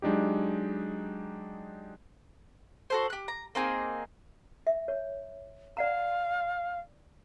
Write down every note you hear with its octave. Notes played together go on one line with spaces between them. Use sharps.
F#3 G#3 D4 D#4 G4
F#4 A4 C5
G4 F#6
A#5
A#3 C4 D#4 G#4
E5
C#5
D5 F5 F#5 A#5